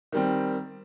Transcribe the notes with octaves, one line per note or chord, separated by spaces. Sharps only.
D#3 G3 C4